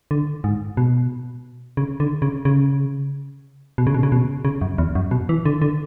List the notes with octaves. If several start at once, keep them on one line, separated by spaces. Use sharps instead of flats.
D3
G#2
B2
C#3
D3
C#3
C#3
B2
C#3
B2
C#3
B2
C#3
F#2
E2
F#2
B2
E3
D3
D3